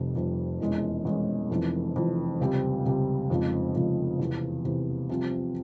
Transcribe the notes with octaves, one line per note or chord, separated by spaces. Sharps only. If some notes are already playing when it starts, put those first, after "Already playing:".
Already playing: F1 F2 C3 G3
F1 F2 C3 G3
E1 E2 E3 G#3 C#4
E1 E2 E3 G#3 C#4
F1 F2 E3
F1 F2 E3
C#2 C3 G3 C4
C#2 C3 G3 C4
F1 F2 C#3 F3 G#3
F1 F2 C#3 F3 G#3
E2 C3 E3
E2 C3 E3
C2 C3 F3 C4 F4